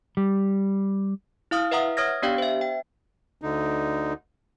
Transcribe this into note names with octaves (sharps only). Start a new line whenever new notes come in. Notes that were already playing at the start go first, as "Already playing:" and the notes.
G3
E4 F5 D#6 F6
B4 E5 F#5 A#5 D#6
C#5 D#6 F6 G#6 A#6
B3 D4 G4 D5 F5 G5
C5 E5
G5
D2 D3 D#4